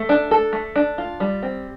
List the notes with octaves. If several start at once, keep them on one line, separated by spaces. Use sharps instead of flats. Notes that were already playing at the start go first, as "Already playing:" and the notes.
Already playing: A3
D4
A4
A3
D4
F4
G3
C4